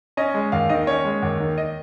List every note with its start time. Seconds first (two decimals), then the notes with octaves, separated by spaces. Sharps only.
0.17 C#4 D#5
0.34 G#3
0.52 D#2 F5
0.69 D#3 D#5
0.87 C#4 C#5
1.05 G#3
1.22 D#2
1.40 D#3
1.58 D#5